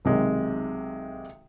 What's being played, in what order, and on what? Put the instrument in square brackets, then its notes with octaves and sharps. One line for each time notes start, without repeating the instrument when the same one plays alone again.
[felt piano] B1 C3 D#3 G#3